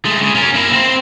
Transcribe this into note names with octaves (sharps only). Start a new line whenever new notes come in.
G#3 A3
C#3
C#4 A#4
A#3 E4
C4 C5